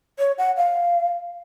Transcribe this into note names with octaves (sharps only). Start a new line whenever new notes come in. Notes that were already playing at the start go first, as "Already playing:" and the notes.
C#5
F#5
F5